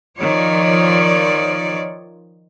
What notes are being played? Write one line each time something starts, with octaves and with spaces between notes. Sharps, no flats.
D#3 F3 C#5 D5